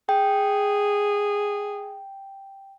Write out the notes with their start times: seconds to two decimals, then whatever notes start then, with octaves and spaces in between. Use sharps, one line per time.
0.09 G#4 G5